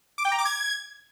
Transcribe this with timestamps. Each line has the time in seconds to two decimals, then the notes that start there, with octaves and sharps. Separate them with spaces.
0.18 D6
0.25 G5
0.32 A#5
0.38 D6
0.45 G#6